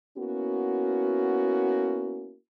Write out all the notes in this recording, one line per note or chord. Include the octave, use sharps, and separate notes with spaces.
A#3 B3 C#4 E4 F#4